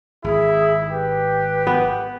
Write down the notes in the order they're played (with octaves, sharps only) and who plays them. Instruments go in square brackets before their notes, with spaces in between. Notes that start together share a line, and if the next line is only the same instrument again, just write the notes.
[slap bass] G#1 [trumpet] E4 [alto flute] G#4
[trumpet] G4 [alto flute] B4
[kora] B3